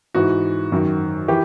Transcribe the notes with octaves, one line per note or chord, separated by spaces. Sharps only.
G#2 E3 F#4
F#2 D#3
E3 G4